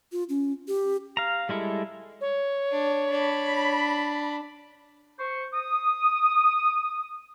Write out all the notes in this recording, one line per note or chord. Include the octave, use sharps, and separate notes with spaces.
F4
C#4
G4
F5 A#5
G3 G#3 E4 A4
C#5
D4
D4 B5
C5 C#6
D#6